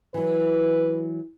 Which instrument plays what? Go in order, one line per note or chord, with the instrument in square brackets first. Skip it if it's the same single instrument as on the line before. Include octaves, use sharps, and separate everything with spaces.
[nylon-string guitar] E3 F#3 [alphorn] B4